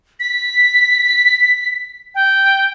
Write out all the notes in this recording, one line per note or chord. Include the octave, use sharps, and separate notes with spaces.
B6
G5